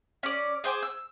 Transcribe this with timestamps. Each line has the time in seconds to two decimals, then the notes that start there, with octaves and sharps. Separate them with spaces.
0.23 C#4 D5
0.64 G#4 C5 G#5 D6
0.83 E6